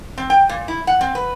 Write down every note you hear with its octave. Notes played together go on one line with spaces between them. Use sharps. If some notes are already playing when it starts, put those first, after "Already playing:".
C4
G5
A#2
E4
F#5
C4
B4